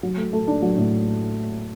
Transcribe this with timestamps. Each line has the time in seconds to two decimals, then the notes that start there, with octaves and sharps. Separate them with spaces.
0.03 F#3
0.17 A3
0.33 A3
0.47 D4
0.62 F#3
0.77 A2